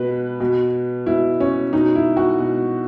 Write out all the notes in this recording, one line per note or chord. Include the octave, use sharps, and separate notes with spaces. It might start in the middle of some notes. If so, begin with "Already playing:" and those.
Already playing: B2 B4
B2
B2 E4
C#4
B2 D#4
E4
F#4
B2